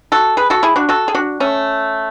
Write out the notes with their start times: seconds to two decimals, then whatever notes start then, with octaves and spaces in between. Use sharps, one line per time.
0.12 F#4 A4
0.37 G#4 B4
0.50 F#4 A4
0.63 E4 G#4
0.76 D4 F#4
0.89 F#4 A4
1.08 G#4
1.15 D4 F#4
1.40 A3 C#4